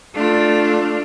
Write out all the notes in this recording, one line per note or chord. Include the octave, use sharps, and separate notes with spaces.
A3 D4 F4